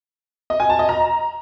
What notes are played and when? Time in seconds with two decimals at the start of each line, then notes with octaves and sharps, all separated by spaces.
0.50 D#5
0.60 G#5
0.69 A5
0.79 D#5
0.89 A#5